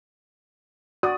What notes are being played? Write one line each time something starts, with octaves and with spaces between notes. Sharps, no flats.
F#4 D5 D#6